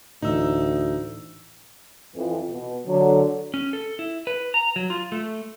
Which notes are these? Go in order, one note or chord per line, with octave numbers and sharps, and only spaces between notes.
D2 A2 E3 D#4 E6
F2 E3
B2
D3 F#3
C#4
A4
E4
B4
A#5
F#3
F4
A3